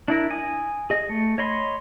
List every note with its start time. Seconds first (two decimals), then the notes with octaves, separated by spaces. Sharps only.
0.08 D4 E4 A#4
0.31 G#5 D#6
0.90 G#4 D#5
1.09 A3
1.38 C#5 D#5 B5 C6